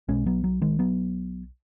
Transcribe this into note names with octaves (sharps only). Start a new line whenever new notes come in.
B1 B2 G#3 C#4
F#3 B3
F#3
D#3 G#3
F#3 B3